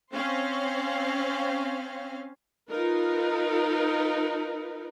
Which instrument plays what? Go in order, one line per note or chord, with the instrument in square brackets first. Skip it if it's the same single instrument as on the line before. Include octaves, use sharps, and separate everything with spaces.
[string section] C4 C#4 C5 F5
[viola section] D#4 F4 A#4 B4